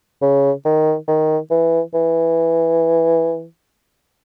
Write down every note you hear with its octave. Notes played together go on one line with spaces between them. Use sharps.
C#3
D#3
D#3
E3
E3